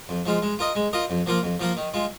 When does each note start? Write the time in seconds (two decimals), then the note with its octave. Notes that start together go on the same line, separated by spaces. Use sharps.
0.09 F2
0.26 F3 G#3 F4
0.42 G#3
0.59 F4 A#4 D#5
0.76 G#3
0.93 F4 A#4 D#5
1.10 F2
1.26 F3 A#3 F4 A#4
1.43 F2
1.60 F3 A#3 F4 A#4
1.77 D#3
1.94 G#3 F4